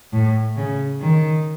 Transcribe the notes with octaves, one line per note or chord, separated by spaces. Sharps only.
A2
C#3
D#3